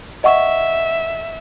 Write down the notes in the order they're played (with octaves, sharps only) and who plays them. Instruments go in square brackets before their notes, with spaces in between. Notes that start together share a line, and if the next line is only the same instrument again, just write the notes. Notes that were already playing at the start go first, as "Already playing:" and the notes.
[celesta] D#5 F#5 C#6 [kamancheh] E5